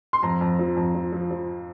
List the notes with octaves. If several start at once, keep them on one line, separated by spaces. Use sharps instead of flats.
C6
F2 A#5
F2
F3
F2
F3
F3
F3